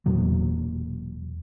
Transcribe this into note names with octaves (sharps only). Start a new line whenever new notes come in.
E1 E2 A#2 F#3